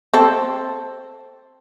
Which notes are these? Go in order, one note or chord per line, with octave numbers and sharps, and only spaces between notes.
C4 A4